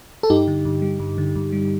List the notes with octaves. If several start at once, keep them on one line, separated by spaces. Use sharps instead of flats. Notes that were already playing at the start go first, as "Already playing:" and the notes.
A4
G2 D#4 G4
D3
G2
G3
G2
D3
G2
G3